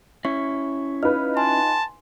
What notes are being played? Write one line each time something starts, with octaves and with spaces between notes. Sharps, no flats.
C#4 E4 C#6
D#4 F4 B4 F6
G#5 A5 C6